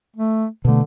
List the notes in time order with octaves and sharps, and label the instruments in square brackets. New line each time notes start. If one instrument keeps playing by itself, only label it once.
[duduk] A3
[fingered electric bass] B2 A3 [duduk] D3